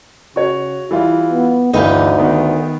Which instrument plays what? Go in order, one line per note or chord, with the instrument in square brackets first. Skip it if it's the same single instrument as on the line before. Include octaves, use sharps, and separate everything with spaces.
[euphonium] C#3 [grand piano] F#4 C#5
[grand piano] E3 G3 F4 [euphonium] E4
[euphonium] B3
[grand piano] G1 E3 F5 [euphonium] D2 [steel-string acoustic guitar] D#4 G4 B4
[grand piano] D#3 B3